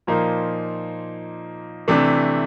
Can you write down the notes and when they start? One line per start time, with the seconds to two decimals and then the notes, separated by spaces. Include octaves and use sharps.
0.07 A#2 F3 A#3 D#4
1.88 C3 E3 A3 D4